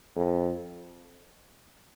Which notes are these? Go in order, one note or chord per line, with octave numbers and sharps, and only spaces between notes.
F2